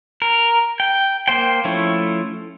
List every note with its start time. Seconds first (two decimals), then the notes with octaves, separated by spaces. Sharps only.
0.22 A#4
0.80 G5
1.28 A#3 C5 G5
1.65 F3 A3 C#4 E4